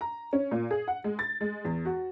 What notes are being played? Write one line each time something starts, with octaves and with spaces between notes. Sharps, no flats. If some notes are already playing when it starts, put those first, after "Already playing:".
A#5
C#4
A#2
G#4
F#5
G#3
A6
G#3
E2
F#4